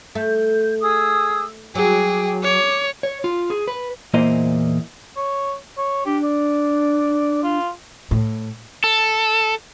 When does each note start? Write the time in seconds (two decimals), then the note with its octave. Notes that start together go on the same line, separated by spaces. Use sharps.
0.15 A3 G6
0.80 G#4 D#6 E6
1.75 F#3 G#4 G5 D6
2.43 C#5 D6
3.03 C#5
3.24 F4
3.50 G#4
3.68 B4
4.14 E2 A#2 A#3 E4 C5 D#5
5.17 C#5
5.78 C#5
6.06 D4 G4
6.23 D5
7.43 F4
8.11 A2
8.84 A4